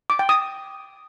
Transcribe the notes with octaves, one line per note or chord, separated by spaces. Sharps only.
D6
G5
D#6